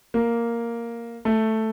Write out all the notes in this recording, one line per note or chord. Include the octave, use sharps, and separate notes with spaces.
A#3
A3